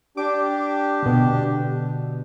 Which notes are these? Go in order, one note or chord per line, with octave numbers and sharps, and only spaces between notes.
D4 G4 D6
B2 D3